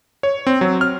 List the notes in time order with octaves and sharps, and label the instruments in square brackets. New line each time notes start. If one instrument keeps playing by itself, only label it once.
[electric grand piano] C#5
C4
F#3
F6